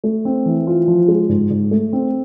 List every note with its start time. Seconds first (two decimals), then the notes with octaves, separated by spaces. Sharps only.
0.04 A3
0.25 C4
0.46 E3
0.67 F4
0.88 F3
1.08 G#3
1.29 G#2
1.50 G#2
1.71 A3
1.93 C4